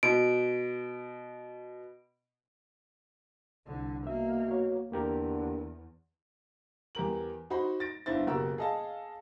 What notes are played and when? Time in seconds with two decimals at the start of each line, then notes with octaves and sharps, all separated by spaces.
0.03 B2 D7
3.66 C2 D3
4.07 B2 A#3 E5
4.48 F#4 C#5
4.92 E2 D3 A#3 G4 A#4
6.95 E2 G4 A#4 F#7
7.50 D#4 F#4 C5 B5 C6
7.80 A6 A#6 D7
8.06 G1 D3 E4 C5 A6
8.27 F#1 B2 F#4 G4 A#4 E6
8.58 G#4 A4 D#5 F5 A5